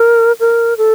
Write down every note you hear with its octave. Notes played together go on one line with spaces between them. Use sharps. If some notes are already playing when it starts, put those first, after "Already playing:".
Already playing: A#4
A#4
A4